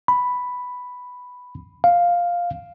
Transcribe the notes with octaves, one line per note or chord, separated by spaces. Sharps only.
B5
F5